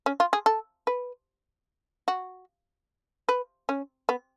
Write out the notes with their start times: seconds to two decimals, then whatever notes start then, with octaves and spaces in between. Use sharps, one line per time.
0.06 C#4
0.20 F4
0.33 G#4
0.46 A4
0.87 B4
2.08 F#4
3.29 B4
3.69 C#4
4.09 B3